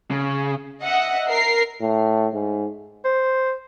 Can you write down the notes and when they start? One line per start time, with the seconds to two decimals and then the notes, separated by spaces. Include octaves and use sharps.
0.11 C#3
0.82 D#5 E5 F#5
1.28 A#4 C7
1.81 A2
2.33 G#2
3.05 C5